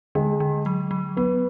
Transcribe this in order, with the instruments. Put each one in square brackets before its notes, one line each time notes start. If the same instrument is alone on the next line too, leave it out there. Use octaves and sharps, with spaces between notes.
[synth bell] D3 [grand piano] G#3
[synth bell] D3
F#3
F#3
[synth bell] F#3 [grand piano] B3